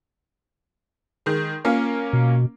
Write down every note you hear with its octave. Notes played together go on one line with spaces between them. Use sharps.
D#3 G#3
A#3 C#4 F4
B2